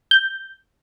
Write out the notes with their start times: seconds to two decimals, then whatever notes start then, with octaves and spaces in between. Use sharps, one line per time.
0.11 G6